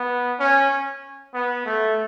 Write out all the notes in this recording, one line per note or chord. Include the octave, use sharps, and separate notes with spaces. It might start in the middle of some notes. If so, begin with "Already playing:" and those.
Already playing: B3
C#4
B3
A3